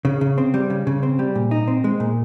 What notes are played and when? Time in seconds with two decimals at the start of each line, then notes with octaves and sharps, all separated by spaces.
0.05 C#3
0.21 C#3
0.38 C4
0.54 G3
0.70 C#3
0.87 C#3
1.03 C4
1.19 G3
1.35 A#2
1.51 D#4
1.68 C4
1.84 G#3
2.00 A#2